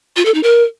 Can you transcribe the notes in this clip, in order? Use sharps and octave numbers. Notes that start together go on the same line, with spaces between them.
F4
A4
D#4
A#4